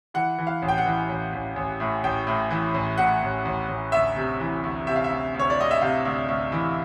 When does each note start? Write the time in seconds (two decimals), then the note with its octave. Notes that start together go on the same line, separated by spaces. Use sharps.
0.14 E3 F#5
0.38 E3
0.47 F5
0.62 A1
0.68 G5
0.78 F#5
0.86 E3
1.09 A1
1.33 A1
1.56 A1
1.80 A2
2.04 A1 G5
2.27 A2
2.50 E3
2.74 A1
2.98 A2 F#5
3.22 A1
3.45 A1
3.69 A1
3.92 D2 E5
4.16 C3
4.40 E3
4.64 D2
4.86 C3 E5
4.96 F5
5.04 E5
5.10 D2
5.34 D2
5.39 C#5
5.50 D5
5.58 D2 D#5
5.71 E5
5.81 C3 F5
6.05 D2
6.28 D2
6.52 E3